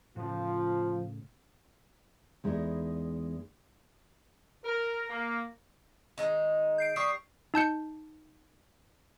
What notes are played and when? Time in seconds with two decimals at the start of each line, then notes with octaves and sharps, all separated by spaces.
0.16 A2 C#3 F3
2.44 E2 G#3 D#4 E4 D5
4.65 A#4
5.10 A#3
6.18 D#3 G#3 D#4
6.78 G6 C7 D7
6.96 G3 C#6 D#6 C7
7.54 D#4 A5 G6 C#7